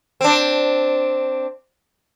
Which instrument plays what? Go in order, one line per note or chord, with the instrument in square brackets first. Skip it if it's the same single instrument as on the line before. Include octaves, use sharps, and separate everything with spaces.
[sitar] C4 D4